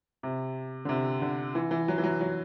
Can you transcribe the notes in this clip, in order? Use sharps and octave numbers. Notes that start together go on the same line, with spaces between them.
C3
D3
C3
D3
E3
E3
F#3
E3
F#3
F#3